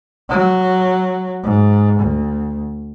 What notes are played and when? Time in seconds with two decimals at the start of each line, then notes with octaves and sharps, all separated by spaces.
0.29 F#3
1.44 G#2
2.00 D2